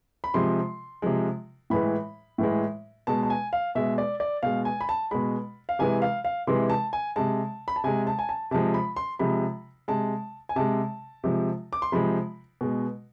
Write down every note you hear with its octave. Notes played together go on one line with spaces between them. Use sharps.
B5
C3 F3 G#3 C6
C3 F3 G#3
A2 E3 G#3 B5
A2 E3 G#3
B2 G#3 A5
A5
G#5
F5
B2 G#3 E5
D5
D5
B2 G#3 F5
G#5
B5
A5
B2 G#3 B5
F5
C3 E3 G#3 G#5
F5
F5
C3 E3 G#3 C6
A5
G#5
C3 G#3 A5
B5
A5
C3 G#3 G#5
A5
G#5
A5
C3 F3 G#3 A5
B5
C6
C3 F3 G#3 B5
C3 G#3 A5
G#5
C3 G#3 A5
C3 F3 G#3
D6
C6
C3 F3 G#3 B5
B2 G#3